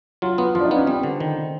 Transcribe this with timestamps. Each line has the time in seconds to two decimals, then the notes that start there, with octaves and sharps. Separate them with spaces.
0.22 F#3 F4
0.38 B3 F4
0.55 F3 F4
0.60 D4
0.65 D#4
0.71 B3
0.76 C#4
0.87 G3 C4
1.03 D3
1.20 D#3